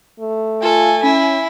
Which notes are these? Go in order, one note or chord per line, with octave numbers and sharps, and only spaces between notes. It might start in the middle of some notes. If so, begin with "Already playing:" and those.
A3
F4 A4 G#5
C#4 E4